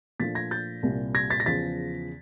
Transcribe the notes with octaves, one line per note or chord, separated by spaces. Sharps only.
A#2 F3 A3 D4 F4 A6 B6
G#6 A#6
G6 A6
C2 A#2 G3
G#6 A#6
A6 B6
A#6
E2 C#3 F3 A6 B6